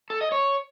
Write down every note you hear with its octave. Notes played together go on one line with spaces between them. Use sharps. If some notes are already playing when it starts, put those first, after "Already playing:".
A4
D#5
C#5